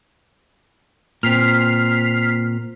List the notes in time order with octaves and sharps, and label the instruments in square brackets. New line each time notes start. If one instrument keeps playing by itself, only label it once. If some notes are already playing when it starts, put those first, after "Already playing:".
[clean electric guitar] A#2 C4 [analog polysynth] F6 B6 C7